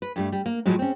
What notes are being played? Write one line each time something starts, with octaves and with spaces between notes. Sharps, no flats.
B4
G2 G3 A3
G3
A#3
A2 F3 F#3 G#3
C4 C#4